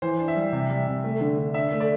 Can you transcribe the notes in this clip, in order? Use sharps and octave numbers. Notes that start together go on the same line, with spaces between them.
E3 C5
D4
E5
G3
C3
G3
C3
A3
D3
D3
D4 E5
A3
D5